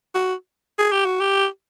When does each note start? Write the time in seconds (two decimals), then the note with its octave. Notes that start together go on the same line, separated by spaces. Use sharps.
0.15 F#4
0.79 G#4
0.92 G4
1.05 F#4
1.20 G4